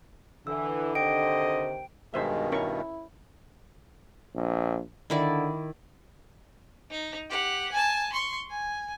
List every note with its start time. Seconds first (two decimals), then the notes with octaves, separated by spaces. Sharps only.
0.47 D3 E3 E6
0.95 C3 D#3 C5 D#5 G5 D7
2.14 G2 B2 D#3 G#3 D#4 C5 E5
2.52 C#4 E4 A#4 C#6
4.35 A#1
5.10 D3 D#3 E4 D5
6.91 D#4
7.30 G4 F#5
7.72 G#5 A5
8.13 C6 C#6
8.50 G#5